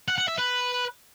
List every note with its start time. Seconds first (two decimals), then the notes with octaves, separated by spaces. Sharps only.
0.08 F#5
0.18 F#5
0.28 E5
0.38 B4